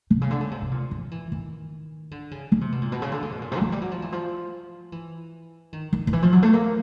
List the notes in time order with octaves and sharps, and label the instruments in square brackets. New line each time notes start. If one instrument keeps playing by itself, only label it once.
[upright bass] C3
C#3
D3
C#3
C3
C3
A#2
F3
E3
D#3
D3
C#3
D3
C3
B2
A#2
B2
C#3
D3
C#3
B2
A#2
C3
G3
F#3
G3
F#3
F3
E3
F3
E3
D#3
D#3
D#3
E3
F3
F#3
A3
A#3